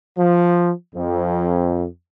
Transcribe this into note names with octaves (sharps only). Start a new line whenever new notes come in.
F3
F2